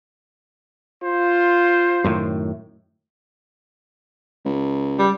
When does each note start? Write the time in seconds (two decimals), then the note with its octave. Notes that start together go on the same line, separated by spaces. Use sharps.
1.03 F4 C5
2.04 F#2 A2 D#3
4.45 C#2
4.99 G3